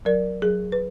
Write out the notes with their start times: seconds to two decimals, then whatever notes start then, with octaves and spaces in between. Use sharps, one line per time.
0.05 F#3 A#4 D5
0.42 F#3 G#4
0.72 B4